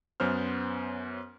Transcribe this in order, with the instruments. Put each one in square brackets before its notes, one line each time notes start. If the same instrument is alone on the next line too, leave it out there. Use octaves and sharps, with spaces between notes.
[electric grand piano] F#2 B3 C#4 C5 F6